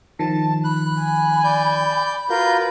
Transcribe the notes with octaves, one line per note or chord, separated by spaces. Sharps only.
D#3 F3 A5
B5 F#6
G#5
D5 G6
F4 F#4 A#4 B4 G6